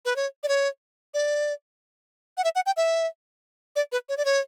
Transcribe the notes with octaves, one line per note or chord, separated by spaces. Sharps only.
B4
C#5
D5
C#5
D5
F#5
E5
F#5
G5
E5
D5
B4
C#5
D5
C#5